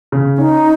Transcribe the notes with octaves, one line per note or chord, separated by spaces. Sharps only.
C#3
C#4 D#4